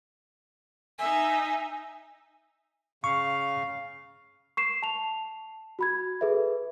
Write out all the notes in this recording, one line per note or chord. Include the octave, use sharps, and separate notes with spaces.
D#4 E5 G#5
C#3 F5 C#6
C#6 C7 E7
A5 F7
F#4 B5 G#6
G#4 A4 B4 E5